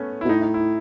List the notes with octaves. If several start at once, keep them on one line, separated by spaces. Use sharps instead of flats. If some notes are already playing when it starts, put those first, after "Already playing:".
Already playing: A3 B3 C#4
E4
B2
A2 D#4
D#4
E4